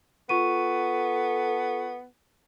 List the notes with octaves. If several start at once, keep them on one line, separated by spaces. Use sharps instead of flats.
B3 F4 A4 C#6 D#7